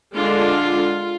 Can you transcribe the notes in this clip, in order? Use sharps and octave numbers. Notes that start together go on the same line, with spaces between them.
D3 G#3 D4 F4